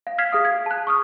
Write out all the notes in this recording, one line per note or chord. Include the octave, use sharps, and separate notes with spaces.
F5
F6 G#6 B6 C7
G#4 F5 D#6
G#6
A5 F#6
C#6 D#6 F6